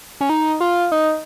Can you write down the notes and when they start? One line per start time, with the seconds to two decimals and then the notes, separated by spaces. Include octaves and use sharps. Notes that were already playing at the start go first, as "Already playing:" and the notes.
0.21 C#4
0.29 D#4
0.60 F4
0.92 D#4